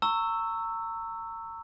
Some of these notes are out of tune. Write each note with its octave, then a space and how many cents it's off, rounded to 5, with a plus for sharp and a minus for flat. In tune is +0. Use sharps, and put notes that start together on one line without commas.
A#5 -35 C#6 +0 E6 +0